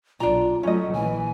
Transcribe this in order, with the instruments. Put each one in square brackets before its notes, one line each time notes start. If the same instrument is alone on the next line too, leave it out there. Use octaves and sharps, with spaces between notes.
[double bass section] B1 [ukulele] D4 A#5 [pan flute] F4
[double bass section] F#3 A3 [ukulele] C#4 D#5
[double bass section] A#1 E3 [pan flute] G#5